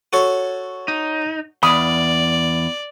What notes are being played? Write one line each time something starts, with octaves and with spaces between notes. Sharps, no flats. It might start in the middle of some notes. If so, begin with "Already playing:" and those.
F#4 A4 C#5
D#4
E2 D5 F5 B5 D#6